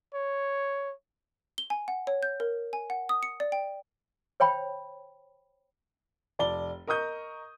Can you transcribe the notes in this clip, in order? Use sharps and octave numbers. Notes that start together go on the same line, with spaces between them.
C#5
G7
G#5
F#5
C#5
G6
A#4
G#5
F#5
D#6
C#7
D5
G5
C5 C#5 G5 B5
F1 D5 A5 G7
A#4 D#5 C#6 D#6 G6